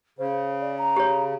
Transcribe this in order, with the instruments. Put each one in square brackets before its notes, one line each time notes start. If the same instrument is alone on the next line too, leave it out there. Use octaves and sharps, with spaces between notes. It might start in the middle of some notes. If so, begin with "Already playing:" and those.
[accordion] C#3 [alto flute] C5
[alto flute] D5
A#5
[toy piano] G4 C#5